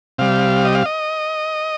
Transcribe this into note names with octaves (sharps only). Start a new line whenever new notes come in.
C3 G3 F5
D#5
F5
D#5